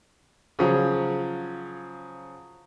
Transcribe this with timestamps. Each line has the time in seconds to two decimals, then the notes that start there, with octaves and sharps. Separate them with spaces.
0.59 C#3 F3 F#3